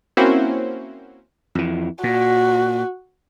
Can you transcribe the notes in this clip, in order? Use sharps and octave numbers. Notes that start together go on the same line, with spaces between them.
A#3 C4 C#4 E4 F#4 C5
F2 E3
A#2 F#4